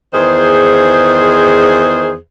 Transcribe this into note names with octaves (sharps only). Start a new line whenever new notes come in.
E2 D#3 G#4 C5